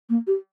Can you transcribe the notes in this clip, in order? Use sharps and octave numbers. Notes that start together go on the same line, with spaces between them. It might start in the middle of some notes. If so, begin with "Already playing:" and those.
A#3
G4